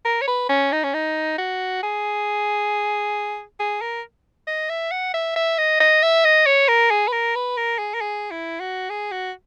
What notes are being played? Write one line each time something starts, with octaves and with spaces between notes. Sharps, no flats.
A#4
C#5
B4
C#4
D#4
C#4
D#4
F#4
G#4
G#4
A#4
D#5
E5
F#5
E5
E5
D#5
D#5
E5
D#5
C#5
A#4
G#4
B4
A#4
B4
A#4
G#4
A#4
G#4
E4
F#4
G#4
F#4